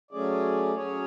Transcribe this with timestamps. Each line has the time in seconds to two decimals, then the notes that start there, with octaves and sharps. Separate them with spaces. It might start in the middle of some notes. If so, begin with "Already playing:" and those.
0.11 F#3 A3 C#4 G#4 D5
0.75 F#3 C#4 G#4 C#5